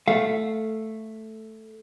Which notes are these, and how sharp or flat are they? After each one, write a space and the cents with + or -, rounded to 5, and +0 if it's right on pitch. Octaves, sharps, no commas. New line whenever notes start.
A3 +0 F5 +0